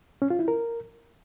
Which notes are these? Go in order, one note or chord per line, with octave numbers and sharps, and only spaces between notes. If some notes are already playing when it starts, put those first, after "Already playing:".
C#4
F4
E4
A#4